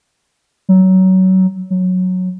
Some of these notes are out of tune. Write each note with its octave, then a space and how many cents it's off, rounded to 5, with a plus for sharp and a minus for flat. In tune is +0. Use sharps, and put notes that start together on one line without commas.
F#3 +20
F#3 -10